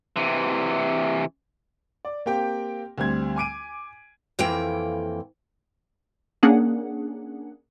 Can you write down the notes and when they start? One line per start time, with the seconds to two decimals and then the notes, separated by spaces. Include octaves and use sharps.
0.16 C3 E3
2.05 D5
2.26 A#3 C4 G4 G5
2.98 D2 G3 C4 G#6
3.36 G#5 D6 D7 D#7
4.39 F2 E3 A#3 G5
6.43 A#3 C#4 D4 G#4 F#5